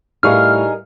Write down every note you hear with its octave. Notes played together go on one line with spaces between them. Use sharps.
A2 G3 D#4 G#4 A#4 F5 C#6 F6